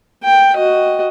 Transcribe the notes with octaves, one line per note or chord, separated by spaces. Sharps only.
G5
F#4 D#5